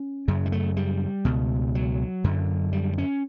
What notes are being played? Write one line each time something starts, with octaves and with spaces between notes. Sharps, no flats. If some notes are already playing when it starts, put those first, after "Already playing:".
Already playing: C#4
F#2 C#3
G3
A3
G3
C#2 B2
F#3
F#2 D3
G3
C#4